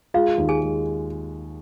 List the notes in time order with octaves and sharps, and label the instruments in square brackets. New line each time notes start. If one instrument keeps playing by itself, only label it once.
[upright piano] G#3 [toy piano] F4 F5
[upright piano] D#2
[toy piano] G#4 G#5
[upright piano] G#3